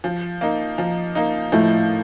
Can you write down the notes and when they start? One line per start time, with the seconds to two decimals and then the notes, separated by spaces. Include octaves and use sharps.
0.04 F3
0.41 A#3 D#4
0.78 F3
1.15 A#3 D#4
1.52 A2 F3 A3